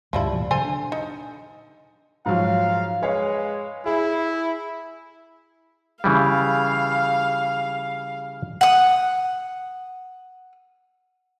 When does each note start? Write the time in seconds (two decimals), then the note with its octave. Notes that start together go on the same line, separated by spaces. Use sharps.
0.13 D2 G2 C3 F3 G3 E4
0.33 A#2 E3 F#3
0.51 C#3 A4 C5 G#5
0.64 D4
0.92 D#4
2.26 G#2 F3 F#3 F5
3.02 G#3 B4 C#5 F5
3.86 E4 G#4
6.04 C#3 E3 G3 F5
8.61 F#5 D#6